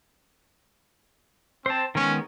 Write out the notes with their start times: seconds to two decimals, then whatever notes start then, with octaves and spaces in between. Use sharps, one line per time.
1.66 C4 C5 A5
1.95 D#3 G#3 B3 C#4